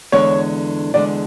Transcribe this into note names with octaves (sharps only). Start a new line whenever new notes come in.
E2 D3 G#3 D4 C#5
E2 D3 G#3 D4 D5